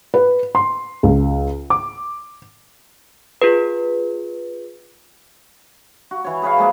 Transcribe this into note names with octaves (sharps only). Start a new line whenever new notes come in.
B4
C6
C#2
D6
F4 G#4 B4
F#4
E3 C#5
G#4 B4 C#5 F5
F3 G#3 A#3 G#4